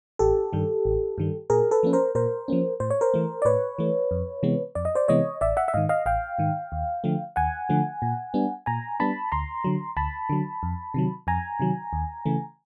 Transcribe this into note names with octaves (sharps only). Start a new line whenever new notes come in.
A1 G4 A4
G2 D#3 G3
A1
G2 D#3 G3
A#2 G#4 A#4
A4 B4
F3 A#3 C#4
A#4 C5
A#2 A#4 C5
F3 A#3 C#4
A2 C5
C#5
A#4 C5
E3 A3
D5
A2 B4 C#5
E3 A3
F2
C3 E3 G#3 B3
F2 D5
D#5
C5 D5
C3 E3 G#3 B3 C#5 D#5
A1 D5 E5
E5 F#5
E5
G#2 D#3 D#5 F5
D#5 F5
A1 F5 G5
G#2 D#3
D#2
D3 F3 A3
D#2 F#5 G#5
D3 F3 A3
A#2
G3 B3 D4
A#2 G#5 A#5
G3 B3 D4 A5 B5
D2 A#5 C6
D3 F#3
D2 A5 B5
D3 F#3
F2
C3 D#3 F#3
F2 G#5 A#5
C3 D#3 F#3
D#2
C#3 E3 A3